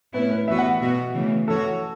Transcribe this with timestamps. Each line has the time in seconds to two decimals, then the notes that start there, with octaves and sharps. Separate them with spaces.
0.14 A2 A3 B3 C#4 E4
0.31 B4
0.48 E3 B3 F#4 B4 E5
0.59 F#5
0.81 B2 B3 F#4
1.14 C#3 E3 A3
1.48 E3 C#4 F#4 A4 C#5